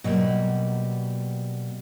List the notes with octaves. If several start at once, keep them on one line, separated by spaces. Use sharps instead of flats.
B2 F#3 G3 A#3